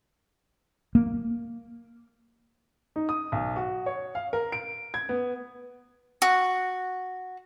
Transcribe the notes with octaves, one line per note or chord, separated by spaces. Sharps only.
A#3
D#4
D#6
B1
F#4
C#5
F5
A#4
D7
G#6
B3
F#4